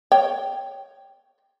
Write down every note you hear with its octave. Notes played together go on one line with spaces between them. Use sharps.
C#5 G5